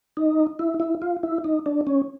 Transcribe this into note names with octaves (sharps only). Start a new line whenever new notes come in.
D#4
E4
E4
F4
E4
D#4
D4
C#4